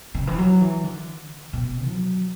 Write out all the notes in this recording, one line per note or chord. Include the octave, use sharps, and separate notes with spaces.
C#3
E3
F#3
E3
D3
B2
F#3